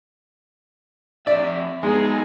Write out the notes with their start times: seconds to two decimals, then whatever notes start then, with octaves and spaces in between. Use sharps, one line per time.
1.27 F2 D5 E5
1.83 G#3 B3 D#4 G#4